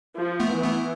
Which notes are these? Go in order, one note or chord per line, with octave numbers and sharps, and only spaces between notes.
F3
A3 B3
E3
A3 B3